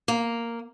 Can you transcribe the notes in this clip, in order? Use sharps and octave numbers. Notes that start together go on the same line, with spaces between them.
A#3